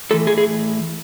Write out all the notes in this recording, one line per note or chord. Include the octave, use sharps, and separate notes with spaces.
A2 E3 A4
G#4
G#4